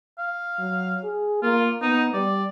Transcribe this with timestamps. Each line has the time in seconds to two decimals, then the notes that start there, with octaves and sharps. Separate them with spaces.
0.19 F5
0.59 F#3
1.04 G#4
1.43 A#3 F4
1.82 B3 D#4
2.14 G3 D5